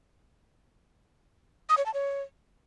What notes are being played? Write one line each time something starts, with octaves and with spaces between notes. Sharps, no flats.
D#6
C#5
A5
C#5